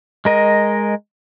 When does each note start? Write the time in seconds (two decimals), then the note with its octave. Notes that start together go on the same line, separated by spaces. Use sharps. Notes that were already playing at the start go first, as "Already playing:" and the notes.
0.25 G#3 A#4 D#5